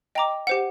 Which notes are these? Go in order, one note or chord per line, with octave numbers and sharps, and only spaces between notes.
D#5 G5 A#5 D6
G4 C5 F#5